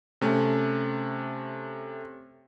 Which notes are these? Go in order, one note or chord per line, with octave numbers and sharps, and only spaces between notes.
C3 A3 C#4